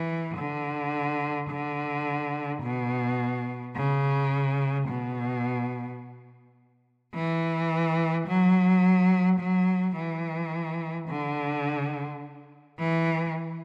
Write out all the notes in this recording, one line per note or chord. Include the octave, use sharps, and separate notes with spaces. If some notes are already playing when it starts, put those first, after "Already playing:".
Already playing: E3
D3
D3
B2
C#3
B2
E3
F#3
F#3
E3
D3
E3